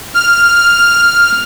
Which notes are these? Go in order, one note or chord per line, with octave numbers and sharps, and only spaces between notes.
F6